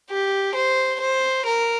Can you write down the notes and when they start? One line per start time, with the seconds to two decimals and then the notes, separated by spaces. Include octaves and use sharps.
0.10 G4
0.55 C5
1.00 C5
1.45 A#4